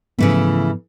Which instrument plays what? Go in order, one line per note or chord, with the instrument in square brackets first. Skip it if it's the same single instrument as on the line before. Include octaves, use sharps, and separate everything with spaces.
[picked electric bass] G#2 F3 B3 [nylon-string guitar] C#3 E3 A3